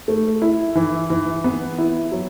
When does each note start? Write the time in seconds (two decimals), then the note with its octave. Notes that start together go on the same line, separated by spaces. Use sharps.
0.08 A3
0.42 E4
0.75 E3
1.10 E3
1.44 B3
1.78 E4
2.12 F#3